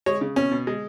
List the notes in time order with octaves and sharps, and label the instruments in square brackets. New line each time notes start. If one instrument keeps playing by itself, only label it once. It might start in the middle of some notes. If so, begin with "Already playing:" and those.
[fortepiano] G#3 C#5
C#3
B2 C#4
B2
G#3